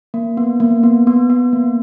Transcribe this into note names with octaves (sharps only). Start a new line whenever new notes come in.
A#3
B3
A#3
B3
B3
B3
A#3